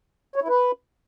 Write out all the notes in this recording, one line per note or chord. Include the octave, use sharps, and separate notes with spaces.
C#5
E4
B4